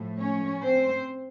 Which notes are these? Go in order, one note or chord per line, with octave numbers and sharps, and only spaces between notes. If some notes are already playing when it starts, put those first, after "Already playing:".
Already playing: A2 F3 A3
C#4 C#5
C4 C5